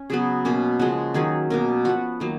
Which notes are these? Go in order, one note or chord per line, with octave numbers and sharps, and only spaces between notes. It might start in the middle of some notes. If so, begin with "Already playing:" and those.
Already playing: C#4
C#3 F#3 B3 G#4
B2 A#3 C#4
C#3 F3 G#3 F#4
D#3 F#3 C#4 G#4
B2 A#3 C#4 A#4
F3 B3 F#4
D#3 F#3 A#3